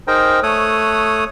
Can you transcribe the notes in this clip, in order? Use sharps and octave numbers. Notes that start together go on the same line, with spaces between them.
D#4 G#4 A#4 C5 G5 A#5
A3 A4 C#5 D#6 F#6